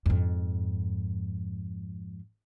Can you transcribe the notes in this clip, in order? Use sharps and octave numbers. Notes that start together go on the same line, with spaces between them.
F2 G#2